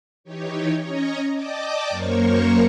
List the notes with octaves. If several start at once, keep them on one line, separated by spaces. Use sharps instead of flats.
E3 D#4 G4 C#5
C#4 C#5 D#5 A#5
D5 D#5 G5 A5 D6
F#2 A#3 A#4 C5 C#5 C#6